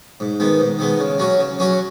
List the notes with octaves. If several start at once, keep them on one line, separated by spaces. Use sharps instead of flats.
G#2
D#3 G#3 B3
G#2
D#3 G#3 B3
C#3
F#3 C#4 F#4
C#3
F#3 C#4 F#4